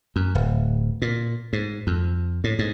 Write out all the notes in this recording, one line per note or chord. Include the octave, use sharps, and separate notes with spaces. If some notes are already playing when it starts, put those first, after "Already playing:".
F#2
D1
A#2
G#2
F2
A2
G#2